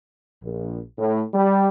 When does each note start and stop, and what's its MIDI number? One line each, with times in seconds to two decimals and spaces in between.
0.42 0.80 34
0.98 1.22 45
1.34 1.69 55